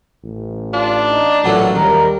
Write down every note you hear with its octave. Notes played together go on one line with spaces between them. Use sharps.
A1
D4 F4
D#4
A1 A#2 F#3 A3 F#4
D#2 G3 A#4